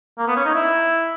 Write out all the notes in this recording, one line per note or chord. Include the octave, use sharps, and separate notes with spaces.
A#3
B3
C#4
D#4
E4